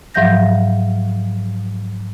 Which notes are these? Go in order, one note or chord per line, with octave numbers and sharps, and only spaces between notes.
G#2 F3 F#3 E5 G6 A#6